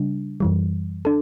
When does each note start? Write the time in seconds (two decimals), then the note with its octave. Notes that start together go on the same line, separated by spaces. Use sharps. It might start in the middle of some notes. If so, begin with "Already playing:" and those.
Already playing: C#3 G3 D4
0.40 F#2 E3 G3
1.05 D4 A4